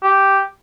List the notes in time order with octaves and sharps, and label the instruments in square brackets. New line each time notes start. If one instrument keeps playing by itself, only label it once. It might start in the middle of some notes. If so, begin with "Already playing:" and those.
[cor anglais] G4